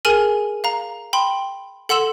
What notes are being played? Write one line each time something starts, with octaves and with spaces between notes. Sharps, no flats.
G#4 A#4 G#5 F6 D#7 F#7
F5 A#5
G5 B5 C6
A4 F#5 C6 E6 E7 F#7